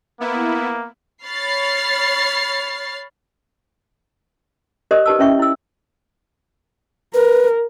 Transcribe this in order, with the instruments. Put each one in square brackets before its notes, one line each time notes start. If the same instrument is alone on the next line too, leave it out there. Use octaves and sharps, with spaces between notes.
[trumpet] A#3 [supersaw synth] B3 E4
[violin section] C#5 B5 F6 A6 C7
[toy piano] G4 A#4 C5 D5 D#5 D#6
D#4 G4 B4 A5 D#6 E6
C#4 E4 C#5 E5 G5 C#6
E4 E6
[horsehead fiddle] A#4 [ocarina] B4